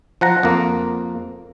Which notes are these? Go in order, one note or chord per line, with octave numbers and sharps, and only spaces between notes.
F3 F#5 A#5
F2 A#3